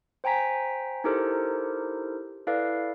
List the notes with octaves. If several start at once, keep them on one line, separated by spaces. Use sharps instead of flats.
C5 G5 G#5 A#5 B6
D#4 E4 G4 A4 A#4 C5
E4 A4 B4 D5 F5